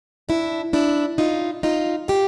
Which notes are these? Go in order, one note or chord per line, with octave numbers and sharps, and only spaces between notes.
D4 E4
D4 E4
D#4 F4
D#4 F4
F4 G4